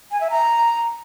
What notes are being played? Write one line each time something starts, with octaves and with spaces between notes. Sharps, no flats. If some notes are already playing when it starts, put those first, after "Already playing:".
G#5
E5
A#5